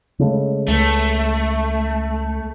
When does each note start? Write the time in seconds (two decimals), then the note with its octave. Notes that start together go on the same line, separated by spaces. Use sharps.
0.19 C#3 G#3 A3
0.68 C#2 A3